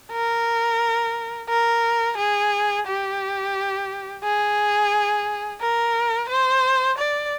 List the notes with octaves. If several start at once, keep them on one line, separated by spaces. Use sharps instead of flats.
A#4
A#4
G#4
G4
G#4
A#4
C5
D5